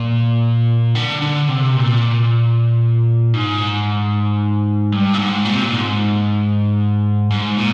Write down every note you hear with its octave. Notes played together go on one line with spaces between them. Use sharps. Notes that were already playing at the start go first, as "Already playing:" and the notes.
Already playing: A#2
D3
D3
C3
A#2
G#2
G2
A#2
G#2
A#2
C3
A#2
G#2
G#2
A#2